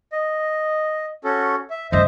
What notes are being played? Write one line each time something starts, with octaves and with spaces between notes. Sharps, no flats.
D#5
C#4 F#4 A4
E5
G2 C#3 C5 D#5 E5